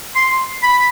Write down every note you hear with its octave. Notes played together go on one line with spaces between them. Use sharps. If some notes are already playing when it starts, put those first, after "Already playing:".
C6
B5